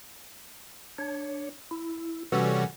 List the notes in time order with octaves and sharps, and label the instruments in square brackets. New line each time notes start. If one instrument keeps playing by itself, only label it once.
[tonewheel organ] D4 C#5
E4
[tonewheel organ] C3 E3 A4 [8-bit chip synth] G3 C#4 F#4